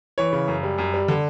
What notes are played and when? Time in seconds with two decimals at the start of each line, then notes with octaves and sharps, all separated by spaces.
0.18 E3 C#5
0.33 C#3
0.48 F#2
0.63 G3
0.78 F#2
0.94 G3
1.08 D3